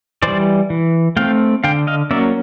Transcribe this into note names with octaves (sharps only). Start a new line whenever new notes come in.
E3 G3 C5 D5
E3
A3 C4 F5 G5
D3 F5 G5
D#5 F5
F#3 A#3 C#4 D5 E5